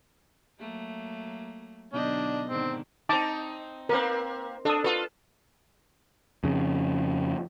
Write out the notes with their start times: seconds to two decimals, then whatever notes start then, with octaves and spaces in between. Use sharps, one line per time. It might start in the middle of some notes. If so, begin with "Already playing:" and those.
0.59 F#3 A3 A#3
1.93 B2 D3 F#3 D4 D#4 D#5
2.49 G#2 D3 D#3 C4
3.09 C4 D#4 A5 D6
3.89 A#3 C4 A#4 B4
4.65 D4 A4 D#6
4.84 F4 A4 B4
6.44 F2 C#3